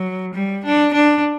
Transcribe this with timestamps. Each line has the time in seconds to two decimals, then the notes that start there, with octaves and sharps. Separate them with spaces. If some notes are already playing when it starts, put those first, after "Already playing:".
Already playing: F#3
0.34 G3
0.65 D4
0.94 D4